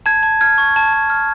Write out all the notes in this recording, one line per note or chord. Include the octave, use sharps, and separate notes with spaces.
A5 G#6
A5
F6 G#6
C#6
A5
A5
F6